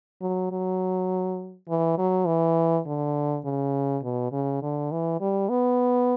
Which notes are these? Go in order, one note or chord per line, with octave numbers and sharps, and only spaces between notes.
F#3
F#3
E3
F#3
E3
D3
C#3
B2
C#3
D3
E3
G3
B3